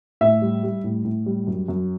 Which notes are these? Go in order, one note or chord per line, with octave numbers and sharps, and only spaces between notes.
A2 E5
G3
G3
A2
A2
G3
F#2
F#2